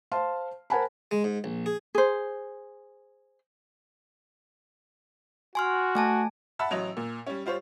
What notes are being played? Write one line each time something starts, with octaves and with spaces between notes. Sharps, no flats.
C5 F5 A5 C6
A#4 C5 F#5 G#5 A5 B5
G#3
G#2
A#1
G#4
G#4 C5
F#4 G#5 C6 F6
A3 G#5 A5
E5 F#5 A5 B5 E6
A1 F#3 D#5 F7
A#2
G3 C#4
G3 F4 C5 C#5